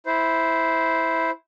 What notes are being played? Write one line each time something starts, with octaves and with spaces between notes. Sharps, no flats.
E4 C5